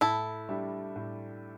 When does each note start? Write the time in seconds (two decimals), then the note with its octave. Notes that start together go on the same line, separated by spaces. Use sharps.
0.01 A2 E4 A4
0.49 G3 D4 G4 E5
0.96 A2